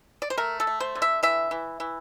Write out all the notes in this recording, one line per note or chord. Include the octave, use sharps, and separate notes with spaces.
D5
C5
A3 A#4
A4
A3
C5
D3
E5
E3 E5
E3
E3